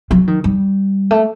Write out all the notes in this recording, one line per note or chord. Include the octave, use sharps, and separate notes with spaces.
F#3
D#3
G3
A3